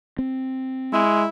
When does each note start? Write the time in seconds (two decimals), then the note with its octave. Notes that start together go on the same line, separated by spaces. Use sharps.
0.19 C4
0.93 G#3 E4